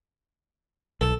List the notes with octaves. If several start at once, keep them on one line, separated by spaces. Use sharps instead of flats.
B1 A4